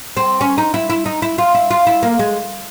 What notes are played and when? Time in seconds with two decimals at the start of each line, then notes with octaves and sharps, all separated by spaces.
0.17 C4
0.41 C#4
0.58 D#4
0.74 E4
0.90 E4
1.06 D#4
1.22 E4
1.38 F4
1.54 E4
1.71 F4
1.87 E4
2.02 A#3
2.19 G#3